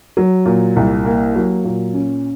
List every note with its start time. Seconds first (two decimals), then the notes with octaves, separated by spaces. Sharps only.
0.17 F#3
0.46 A#2
0.76 C2
1.05 A#3
1.36 F#3
1.65 A#2
1.94 C#4